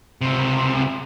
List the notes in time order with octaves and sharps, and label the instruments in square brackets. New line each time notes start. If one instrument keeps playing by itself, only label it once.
[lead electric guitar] C#2 C3